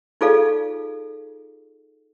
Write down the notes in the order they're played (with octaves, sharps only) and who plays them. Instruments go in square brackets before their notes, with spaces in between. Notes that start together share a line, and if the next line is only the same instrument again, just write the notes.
[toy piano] D#4 F4 G#4 A4 D5 F5